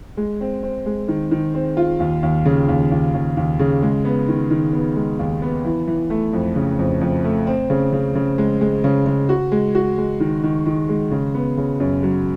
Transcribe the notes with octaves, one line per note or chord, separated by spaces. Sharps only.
G#3
C4
C4
G#3
D#3
D#3
C4
F4
D#2
D#2
C#3
D#2
D#2
D#2
D#2
C#3
G#3
B3
D#3
D#3
B3
G#3
D#2
B3
E3
E3
A3
F2
C#3
F2
F2
A3
C4
C#3
C#3
C#3
G#3
G#3
C#3
C#3
F#4
G#3
F#4
G#3
D#3
D#3
D#3
G#3
C#3
B3
C#3
F#2
F#3